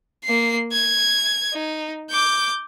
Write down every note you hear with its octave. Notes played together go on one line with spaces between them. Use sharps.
A#3 C7
G#6
D#4
D6 G6